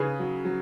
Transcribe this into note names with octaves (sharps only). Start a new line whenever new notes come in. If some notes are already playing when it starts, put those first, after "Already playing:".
Already playing: C#3 G#4 B4
F#3
F#3